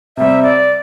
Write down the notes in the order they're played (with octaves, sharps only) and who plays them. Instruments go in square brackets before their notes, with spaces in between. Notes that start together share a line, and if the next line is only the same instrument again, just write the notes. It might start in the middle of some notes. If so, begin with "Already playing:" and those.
[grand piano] C3 G3 C4 [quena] E5
[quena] D5